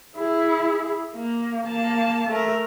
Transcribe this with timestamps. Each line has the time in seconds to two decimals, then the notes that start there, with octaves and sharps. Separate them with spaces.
0.16 E4 G#4
1.15 A#3
1.66 A#3 A5
2.29 A3 A#4